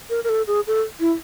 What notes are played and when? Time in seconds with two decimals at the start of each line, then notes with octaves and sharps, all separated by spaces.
0.10 A#4
0.24 A#4
0.29 A4
0.47 G#4
0.67 A4
1.00 E4